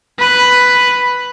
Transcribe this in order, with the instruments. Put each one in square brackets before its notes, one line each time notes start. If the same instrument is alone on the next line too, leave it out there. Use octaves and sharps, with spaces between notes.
[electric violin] B4